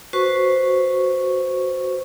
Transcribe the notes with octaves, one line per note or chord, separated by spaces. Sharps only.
F#4 B4 C5 C#6